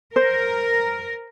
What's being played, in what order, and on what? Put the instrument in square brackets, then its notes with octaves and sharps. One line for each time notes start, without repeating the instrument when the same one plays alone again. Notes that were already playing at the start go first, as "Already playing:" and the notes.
[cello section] A#4 [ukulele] C5